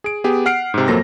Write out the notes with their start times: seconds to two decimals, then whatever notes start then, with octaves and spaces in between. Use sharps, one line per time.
0.04 G#4 D7
0.24 B3 G4 G#4
0.46 F#5 F6 C7 D7
0.74 G#2 C3
0.88 F2 F#3 A#3 A4 C5 A#6